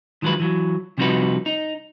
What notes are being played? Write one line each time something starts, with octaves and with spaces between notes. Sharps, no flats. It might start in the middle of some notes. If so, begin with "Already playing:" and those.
D#3 F3 F#3 G#3 B4
E3 F#3
C3 F3 G3 D#4 F#4 B4
D#4